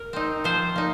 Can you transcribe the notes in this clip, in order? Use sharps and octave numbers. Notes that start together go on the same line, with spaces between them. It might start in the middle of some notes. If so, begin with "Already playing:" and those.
Already playing: A#4
C4 D#4
F3 C5
A#3 D#4